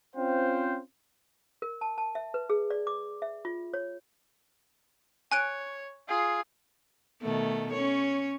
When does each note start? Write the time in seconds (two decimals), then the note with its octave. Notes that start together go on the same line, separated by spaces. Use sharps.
0.16 C4 C#4 F4 C5 F5 G5
1.62 A#4
1.81 A5
1.98 A5
2.15 E5
2.34 B4
2.50 G#4
2.70 D5
2.87 D6
3.22 E5
3.45 F4
3.74 C#5
5.32 C#5 G#5 F#6 D7
6.08 F4 G#4
7.22 B2 D#3 A3
7.73 C#4 C#5